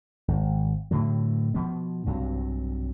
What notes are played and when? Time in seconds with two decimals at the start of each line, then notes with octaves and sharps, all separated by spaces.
0.28 G#1
0.91 A2 D3 F#3
1.54 B2 F3 B3
2.06 B1 G2 C3 F#3